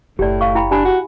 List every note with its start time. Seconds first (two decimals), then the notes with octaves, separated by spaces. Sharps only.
0.19 F#1 A2 G4 D5
0.41 F5 C#6
0.55 E4 G5 B5
0.71 D4 G4 G#5 B5
0.85 F#4